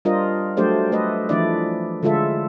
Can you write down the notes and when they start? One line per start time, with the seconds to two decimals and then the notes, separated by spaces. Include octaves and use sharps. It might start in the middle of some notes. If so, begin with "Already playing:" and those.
0.05 G3 D4 F4 A#4 C5 D#5
0.57 F#3 A3 D4 G4 C5 D5
0.92 A3 A4 B4 D#5
1.29 E3 F3 A3 D4 E4 D5
2.03 D3 G#3 F4 A4 E5